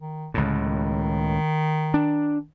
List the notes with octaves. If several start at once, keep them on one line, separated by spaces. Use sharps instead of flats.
D#3
C#2 A2 D3
D#3
D4